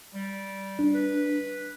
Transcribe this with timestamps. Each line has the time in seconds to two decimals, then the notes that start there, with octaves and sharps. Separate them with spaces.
0.14 G3
0.79 D4
0.94 B4